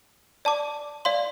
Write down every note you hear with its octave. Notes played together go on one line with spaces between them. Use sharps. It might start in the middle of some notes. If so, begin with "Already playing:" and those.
D5 A5 D6
D5 F5 C6